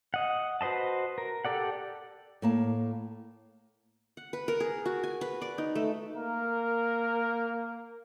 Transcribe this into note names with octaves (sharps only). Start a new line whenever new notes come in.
D#5 F#5
F#4 B4 C5 D#5 A5
A#4
G4 A4 D5 F#5
A2 A#3 A5
F#5
B4
A#4
G#4
F#4
G#5
B4
D5
D#4
A3
A#3 A#4